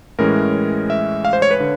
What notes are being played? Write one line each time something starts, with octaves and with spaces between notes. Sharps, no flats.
A2 E3 G#3 C#4 A#4
E5
F5
C5
C#5
B4
D3